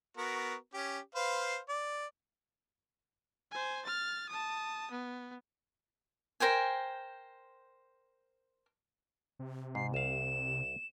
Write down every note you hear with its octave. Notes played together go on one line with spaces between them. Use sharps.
B3 F#4 A#4
C#4 G4
B4 C5 F5
D5
C5 G#5
F6 A6
A5 D#6
B3
A#4 C5 G5 G#5
C3
G#2 C7
C2 F5 E7